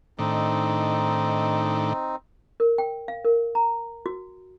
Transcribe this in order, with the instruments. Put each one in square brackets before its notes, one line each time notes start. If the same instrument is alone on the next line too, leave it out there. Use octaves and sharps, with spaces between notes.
[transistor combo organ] A2 D#3 D4 [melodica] C4 D#4
[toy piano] A#4
G5
F5
A#4
A#5
F#4